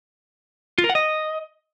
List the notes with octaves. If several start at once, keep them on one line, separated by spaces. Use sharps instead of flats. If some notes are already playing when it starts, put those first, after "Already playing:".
F4
A#4
F#5
D#5